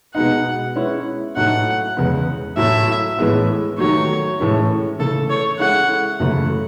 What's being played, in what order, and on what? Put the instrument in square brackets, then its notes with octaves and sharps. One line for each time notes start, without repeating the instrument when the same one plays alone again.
[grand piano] B2 G#3 B3 D#4 [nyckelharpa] F#5
[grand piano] G#3 C#4 E4 B4
[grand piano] A2 F#3 A3 D#4 [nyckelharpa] F#5
[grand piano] E2 C#3 G#3 B3
[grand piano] A2 F#3 A3 E4 [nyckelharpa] E5
[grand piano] A2 E3 G#3 B3
[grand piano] D#3 F#3 A3 [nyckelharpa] C#5
[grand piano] A2 E3 G#3 C#4
[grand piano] C#3 E3 A3 [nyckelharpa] A4
[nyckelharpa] C#5
[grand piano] G#3 C#4 E4 A4 [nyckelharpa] F#5
[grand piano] F#2 C#3 E3 A3 E4